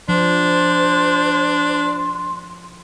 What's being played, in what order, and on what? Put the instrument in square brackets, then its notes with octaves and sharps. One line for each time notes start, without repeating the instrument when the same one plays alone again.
[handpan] F3 [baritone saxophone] D4 [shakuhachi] C5 [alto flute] C6